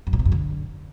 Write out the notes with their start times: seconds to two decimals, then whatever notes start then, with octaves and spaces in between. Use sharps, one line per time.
0.07 F#2
0.13 A2
0.19 C3
0.25 F#2
0.32 D3